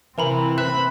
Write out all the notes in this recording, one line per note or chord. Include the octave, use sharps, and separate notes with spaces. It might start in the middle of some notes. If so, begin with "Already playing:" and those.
C3 E3 C4 A#4 A#5 B5
B4 B5 F#6 E7